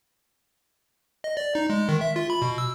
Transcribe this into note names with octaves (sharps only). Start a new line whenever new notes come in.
D#5
D5
D#4
G#3
D#3
E5
F4
B5
B2
E6